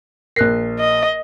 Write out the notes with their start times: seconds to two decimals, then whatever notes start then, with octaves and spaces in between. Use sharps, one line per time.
0.36 A#1 A#4 F#6 C7
0.80 D#5